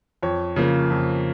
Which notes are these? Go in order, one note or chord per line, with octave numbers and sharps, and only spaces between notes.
F2 C#5
C#3 F3 A#3
F2